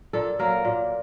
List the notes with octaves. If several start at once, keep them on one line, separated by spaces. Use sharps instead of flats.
A#2 A4
F#3 A#3 A#4
A#2